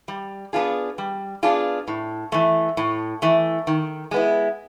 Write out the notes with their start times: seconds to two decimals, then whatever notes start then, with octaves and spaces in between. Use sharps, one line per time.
0.08 G3
0.53 B3 D4 F4 G#4
0.98 G3
1.43 B3 D4 F4 G#4
1.88 A2
2.32 E3 A3
2.77 A2
3.22 E3 A3
3.67 D#3
4.11 G#3 B3 E4